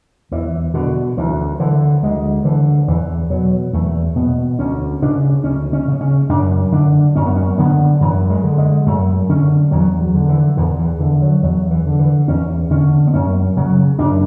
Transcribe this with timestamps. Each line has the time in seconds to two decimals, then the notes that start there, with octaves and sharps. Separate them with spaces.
0.32 E2 E3
0.74 B2 D3
1.17 D2 E3
1.60 D3 E3
2.03 D2 G#3
2.45 D3 E3
2.88 E2 E3
3.30 B2 F#3
3.73 E2 A3
4.16 B2 B3
4.59 D2 C#4
5.02 C#3 D4
5.44 D2 C#4
5.73 C#4
5.88 C#3
6.01 C#4
6.29 F#2 D4
6.72 D3 D4
7.15 F#2 C#4
7.26 B3
7.36 C#4
7.58 D3 B3
8.01 F#2 E3
8.30 G#3
8.44 D3
8.58 G#3
8.86 F#2 A3
9.29 D3 C#4
9.71 E2 F#3
10.01 F#3
10.14 D3
10.29 E3
10.57 E2 D3
10.79 E3
11.00 D3 E3
11.22 F#3
11.42 E2 F#3
11.71 E3
11.86 D3
11.99 E3
12.28 E2 C#4
12.70 D3 C#4
13.07 B3
13.14 F#2 C#4
13.57 C#3 F#3
13.99 F#2 D4